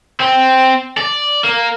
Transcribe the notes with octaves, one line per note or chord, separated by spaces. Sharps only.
C4
D5
A#3